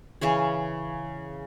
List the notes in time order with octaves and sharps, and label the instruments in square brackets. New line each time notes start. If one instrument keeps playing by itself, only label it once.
[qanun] C#3 E3 C#4 G#4